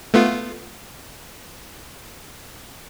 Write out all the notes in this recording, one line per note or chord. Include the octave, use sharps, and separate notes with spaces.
A3 B3 F4